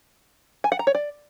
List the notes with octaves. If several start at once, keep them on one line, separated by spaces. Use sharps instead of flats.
G#5
F#5
A#5
C#5
D5